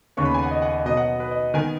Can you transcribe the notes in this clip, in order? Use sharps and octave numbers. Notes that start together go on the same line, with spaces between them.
D#2 C#3 B3 C#6
B5
G#5
F#5
D#5
F#5
D#5
B2 F#3 B3 D#5
F#5
B4
D#5
D#3 B3 G#5